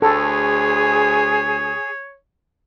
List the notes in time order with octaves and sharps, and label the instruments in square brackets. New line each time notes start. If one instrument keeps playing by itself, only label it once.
[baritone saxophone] D2 [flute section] G#4 [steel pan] A4 [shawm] C#5